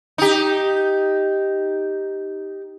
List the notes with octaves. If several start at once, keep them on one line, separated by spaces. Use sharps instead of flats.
D#4 G4